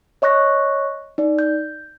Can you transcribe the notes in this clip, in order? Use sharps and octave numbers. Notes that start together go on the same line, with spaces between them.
C#5 D#5 C#6 F#6 A#6
D#4 D5
G6